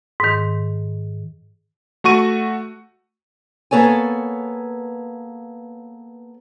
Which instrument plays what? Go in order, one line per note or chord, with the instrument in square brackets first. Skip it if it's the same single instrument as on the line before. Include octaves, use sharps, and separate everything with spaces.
[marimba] G#2 D#3
[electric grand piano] A3 F#4 C#6 D#7
[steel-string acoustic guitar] A#3 B3 A4 C#5 G#5